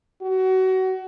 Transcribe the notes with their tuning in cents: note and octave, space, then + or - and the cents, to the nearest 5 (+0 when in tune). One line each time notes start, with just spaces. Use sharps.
F#4 +25